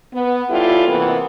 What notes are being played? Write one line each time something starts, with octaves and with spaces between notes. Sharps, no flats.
B3
G3 C#4 E4 F4 G4 A4
C3 E3 A#3 B3